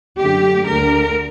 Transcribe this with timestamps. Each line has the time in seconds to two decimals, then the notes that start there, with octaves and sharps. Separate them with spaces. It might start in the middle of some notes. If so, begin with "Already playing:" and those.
0.18 F#2 D3 A3 G4
0.68 D2 D3 A3 A#4